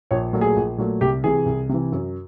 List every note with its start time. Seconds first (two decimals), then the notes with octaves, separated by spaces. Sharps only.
0.11 A#1 C#5
0.33 A#2 F#3 A3
0.41 G#4
0.56 A#1
0.78 A#2 F#3 A3
1.01 C2 G4
1.24 C3 E3 G#4
1.46 C2
1.69 C3 E3
1.92 F#2